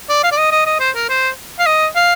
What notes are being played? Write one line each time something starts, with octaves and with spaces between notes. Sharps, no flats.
D5
F5
D5
D#5
D#5
D#5
C5
A#4
C5
F5
D#5
F5